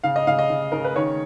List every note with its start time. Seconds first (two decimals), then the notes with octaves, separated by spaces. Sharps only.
0.04 C#3 F5
0.16 D#5
0.27 C#3 F5
0.39 D#5
0.50 C#3
0.72 C#3 A#4
0.84 B4
0.96 D#3 C#5